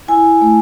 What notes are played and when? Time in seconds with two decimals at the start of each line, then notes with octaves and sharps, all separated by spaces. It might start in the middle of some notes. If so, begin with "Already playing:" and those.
0.08 E4 G#5
0.42 A3